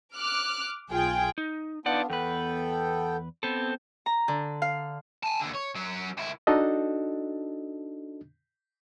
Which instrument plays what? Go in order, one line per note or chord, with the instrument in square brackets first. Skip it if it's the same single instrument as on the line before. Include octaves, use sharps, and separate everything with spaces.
[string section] D6 F6 F#6
B1 F4 G#4 G5
[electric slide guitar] D#4
[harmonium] B3 D4 F4 [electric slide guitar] D#4 D5 F#5
[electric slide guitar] E2 B4 [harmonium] B3 A4 G5
[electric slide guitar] B3 C4 A4
[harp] A#5
D3
F5
[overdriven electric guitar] G#5 A5
D#2 D3
C#5
F#3 C#4
C#2 E4
[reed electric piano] D4 D#4 F#4 A4 D#5